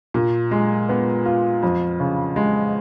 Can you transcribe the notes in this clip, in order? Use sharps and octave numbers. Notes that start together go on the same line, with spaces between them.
A#2
G#3
B3
F4
F2
C#3
G#3